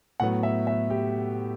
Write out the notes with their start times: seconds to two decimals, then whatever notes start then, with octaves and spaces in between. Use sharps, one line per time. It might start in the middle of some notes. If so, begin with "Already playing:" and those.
0.20 A2 F#3 B3 F#5
0.43 E5
0.67 E5
0.90 G4